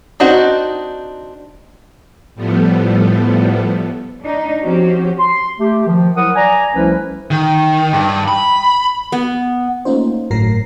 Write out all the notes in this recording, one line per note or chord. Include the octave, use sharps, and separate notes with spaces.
C4 D4 D#4 F#4
A2 F3 G3 A3 B3
D4 D#4
F3 C4 C#4 F#4 G4
C6
A3 G4
D#3 F3
F3 F#3 E4 A#4 F#5 D#6
D5 G#5 A#5
C2 F3 A3 C#4 E4 B4
D#3
G2
B5
B3
A3 A#3 C#4 D#4 F4 C5
G1 A2 F#3 A#4 A#6 C7